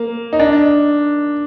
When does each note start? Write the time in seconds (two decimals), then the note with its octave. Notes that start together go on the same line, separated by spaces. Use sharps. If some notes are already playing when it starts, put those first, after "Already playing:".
Already playing: A#3
0.33 D#4
0.39 D4